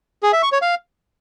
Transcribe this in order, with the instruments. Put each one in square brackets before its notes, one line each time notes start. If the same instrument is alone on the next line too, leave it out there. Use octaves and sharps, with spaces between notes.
[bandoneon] G#4
E5
C#6
C#5
F5